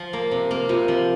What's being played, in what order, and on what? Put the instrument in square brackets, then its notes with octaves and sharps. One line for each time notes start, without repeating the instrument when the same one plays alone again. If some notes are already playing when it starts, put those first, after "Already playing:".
Already playing: [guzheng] F3
A#3
C3
A#3
[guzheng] C3 [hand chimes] F4
[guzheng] F3